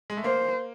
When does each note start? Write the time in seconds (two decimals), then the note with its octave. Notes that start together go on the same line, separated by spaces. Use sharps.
0.10 G#3
0.17 A3
0.24 A#3 C5